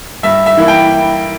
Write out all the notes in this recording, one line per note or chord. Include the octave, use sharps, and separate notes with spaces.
G2 E5
E5
E3 A#3 E4
G5